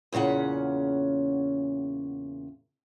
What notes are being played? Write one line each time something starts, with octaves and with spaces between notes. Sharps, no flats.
E2 A#2 C#3 C#4 F#5